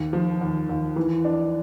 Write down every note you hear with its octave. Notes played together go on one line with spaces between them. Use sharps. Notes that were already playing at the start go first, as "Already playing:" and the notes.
Already playing: D#2
F3
D#2
D#2
E3
D4